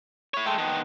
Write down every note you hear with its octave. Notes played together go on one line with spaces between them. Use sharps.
E4 C#5
G#3 A3 G5 A5
D#3 B3